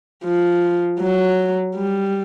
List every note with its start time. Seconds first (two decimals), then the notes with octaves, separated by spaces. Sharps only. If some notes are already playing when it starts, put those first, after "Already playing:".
0.24 F3
1.00 F#3
1.76 G3